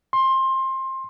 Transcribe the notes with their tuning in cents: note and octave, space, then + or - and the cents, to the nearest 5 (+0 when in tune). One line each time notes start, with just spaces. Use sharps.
C6 +20